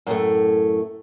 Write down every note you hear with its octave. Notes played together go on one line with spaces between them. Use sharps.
F#2 A2 A3